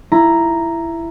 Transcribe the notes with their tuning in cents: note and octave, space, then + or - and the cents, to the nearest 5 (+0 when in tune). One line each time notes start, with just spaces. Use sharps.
E4 +15 A#5 +0